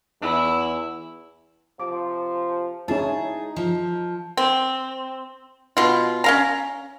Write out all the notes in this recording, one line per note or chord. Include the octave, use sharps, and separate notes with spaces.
E2 E4
C3 F3 D6
G#3 C#4 D#4 E4 G#4 A5
F3
C4
B2 F4
C#4 F5 A#5